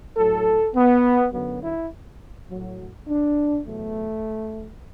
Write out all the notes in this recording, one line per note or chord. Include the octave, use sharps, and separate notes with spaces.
A2 F#3 A4
B3
F#2 D3 F#3 B3
E4
A2 F#3
D4
E2 B2 F#3 A3